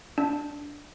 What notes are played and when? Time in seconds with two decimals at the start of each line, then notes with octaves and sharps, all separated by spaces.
0.18 D4